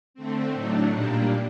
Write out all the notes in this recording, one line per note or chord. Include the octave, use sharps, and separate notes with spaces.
D3 A3 C4
A2 F#3 A3 D4 D#4
A#2 G3 A#3 D4 D#4